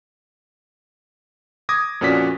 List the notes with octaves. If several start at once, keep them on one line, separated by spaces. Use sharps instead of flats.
D6 D#6 G#6 A#6
F2 A#2 C#4 F#4 D5 B6